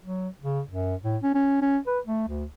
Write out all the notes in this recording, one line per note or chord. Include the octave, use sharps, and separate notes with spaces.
F#3
C#3
F#2
A2
C#4
C#4
C#4
B4
A3
D2